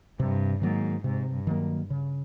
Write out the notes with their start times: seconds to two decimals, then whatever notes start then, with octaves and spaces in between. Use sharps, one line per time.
0.20 G2 C3
0.61 G#2 D#3 F#3 A#3
1.04 G#2 C3
1.33 G2
1.47 D#3 F#3 A#3
1.90 C#3